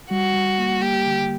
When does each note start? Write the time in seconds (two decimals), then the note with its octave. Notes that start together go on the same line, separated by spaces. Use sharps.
0.10 G3 F#4
0.34 G3
0.59 A#3
0.81 A#3 G4
1.06 D3